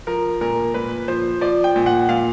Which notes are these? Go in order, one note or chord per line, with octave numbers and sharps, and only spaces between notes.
F3 A#4
A#2 A#4
A#2 B4
F3 C5
F3 D5
G5
A#2
F#5
A#2 F5